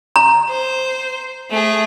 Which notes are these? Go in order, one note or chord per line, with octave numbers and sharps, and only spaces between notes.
A#5
C5
A3 G#4